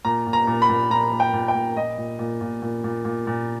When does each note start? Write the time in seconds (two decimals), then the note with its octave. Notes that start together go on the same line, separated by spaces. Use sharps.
0.05 A#2 A#5
0.27 A#2
0.33 A#5
0.47 A#2
0.62 B5
0.69 A#2
0.90 A#2 A#5
1.12 A#2
1.20 G5
1.33 A#2
1.48 G5
1.54 A#2
1.77 A#2 D#5
1.97 A#2
2.19 A#2
2.41 A#2
2.62 A#2
2.84 A#2
3.05 A#2
3.27 A#2